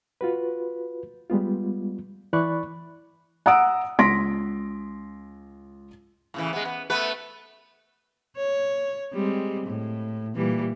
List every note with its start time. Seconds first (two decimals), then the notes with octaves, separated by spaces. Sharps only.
0.21 F4 F#4 B4
1.30 G3 G#3 B3 F4
2.33 E3 E4 D5 B5 C#6 F#6
3.46 F#5 A#5 D#6 E6 D7
3.99 C#2 C6 A#6 B6 D7
6.34 A2 C#3 E3
6.53 G#3 B3
6.65 B3
6.90 A3 B3 B4
8.37 C#5
9.13 G3 G#3 C4
9.67 A2
10.35 A#2 E3 G3